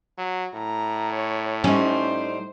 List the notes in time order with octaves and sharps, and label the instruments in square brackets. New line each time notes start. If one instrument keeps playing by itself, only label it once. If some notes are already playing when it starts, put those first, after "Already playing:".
[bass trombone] F#3
[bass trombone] A2 [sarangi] A#5
[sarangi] C#5
[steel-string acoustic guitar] G3 D#4 [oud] C#4 [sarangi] C5